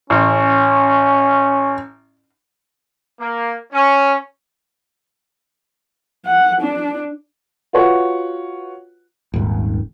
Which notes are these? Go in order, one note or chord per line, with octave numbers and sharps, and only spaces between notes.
A1 C#4
A#3
C#4
F#5
D4
F4 F#4 B4 C#5 F#5
D#1 G#1